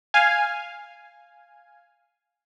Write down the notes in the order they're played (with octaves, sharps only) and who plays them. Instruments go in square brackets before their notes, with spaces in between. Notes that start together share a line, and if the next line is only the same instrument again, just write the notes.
[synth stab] F5 G#5